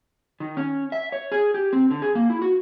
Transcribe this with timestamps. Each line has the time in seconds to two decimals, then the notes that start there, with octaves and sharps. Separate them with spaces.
0.40 D#3
0.57 C#4
0.92 E5
1.12 C#5
1.32 G#4
1.54 G4
1.73 C4
1.91 D3
2.02 G#4
2.15 A#3
2.30 E4
2.42 F#4